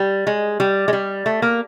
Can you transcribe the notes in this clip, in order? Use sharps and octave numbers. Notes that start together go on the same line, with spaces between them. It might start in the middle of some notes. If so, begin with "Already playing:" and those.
Already playing: G3
G#3
G3
G#3
G3
A3
A#3